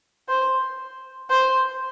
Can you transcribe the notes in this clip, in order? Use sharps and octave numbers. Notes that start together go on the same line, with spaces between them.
C5
C5